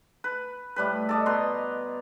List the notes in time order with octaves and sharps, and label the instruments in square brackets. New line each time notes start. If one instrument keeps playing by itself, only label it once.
[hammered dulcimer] B4
A2 G3 B4
A4 D5 D#5
B2 B4 A#5 C6